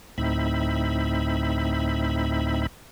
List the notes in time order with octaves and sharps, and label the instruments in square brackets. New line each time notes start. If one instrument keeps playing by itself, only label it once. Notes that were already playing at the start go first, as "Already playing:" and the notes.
[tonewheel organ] D2 A2 C4 D#4 E5 B5